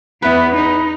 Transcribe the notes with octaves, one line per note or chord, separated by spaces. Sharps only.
E2 B3 E4 B4
D#4